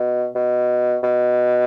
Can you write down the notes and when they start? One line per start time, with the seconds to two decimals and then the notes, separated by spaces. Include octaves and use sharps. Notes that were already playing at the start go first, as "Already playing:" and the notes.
Already playing: B2
0.35 B2
1.04 B2